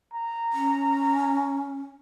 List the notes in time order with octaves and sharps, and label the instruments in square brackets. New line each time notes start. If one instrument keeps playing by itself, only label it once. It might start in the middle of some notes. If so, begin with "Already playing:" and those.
[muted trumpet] A#5
[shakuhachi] C#4